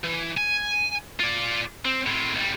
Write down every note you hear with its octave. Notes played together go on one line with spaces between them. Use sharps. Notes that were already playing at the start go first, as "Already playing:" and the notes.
E3
G#5
F4 D5
C4
A2 C4
B1 G3